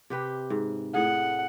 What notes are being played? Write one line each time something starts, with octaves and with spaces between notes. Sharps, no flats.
C3 G4 B4
G#2
A2 G#4 F#5